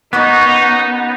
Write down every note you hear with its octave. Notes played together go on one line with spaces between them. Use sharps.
A#3 B3 C#4 D#4 F#4